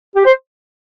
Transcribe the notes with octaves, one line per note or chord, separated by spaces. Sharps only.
G4
C5